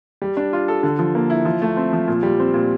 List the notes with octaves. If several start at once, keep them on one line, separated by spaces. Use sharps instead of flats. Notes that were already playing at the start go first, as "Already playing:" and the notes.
G3
D4
F4
A4
D3
F3
A#3
E4
F3
A3
C4
F3
A#2
G3
C4
A#2